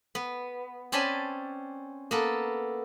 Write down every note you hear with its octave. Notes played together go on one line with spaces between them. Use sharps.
B3
C4 C#4 D5 G#5 A5 B5
A#3 B3 A4